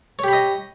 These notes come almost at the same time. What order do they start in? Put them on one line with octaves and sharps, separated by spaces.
C#5 G4 B5 D#5